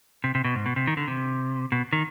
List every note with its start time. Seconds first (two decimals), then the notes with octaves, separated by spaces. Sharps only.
0.24 C3
0.35 C3
0.44 B2
0.55 G#2
0.66 B2
0.76 C3
0.87 D#3
0.97 D3
1.08 C3
1.72 B2
1.93 D#3